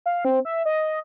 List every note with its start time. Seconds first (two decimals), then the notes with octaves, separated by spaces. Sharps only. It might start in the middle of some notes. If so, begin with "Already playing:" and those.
0.06 F5
0.25 C4
0.45 E5
0.65 D#5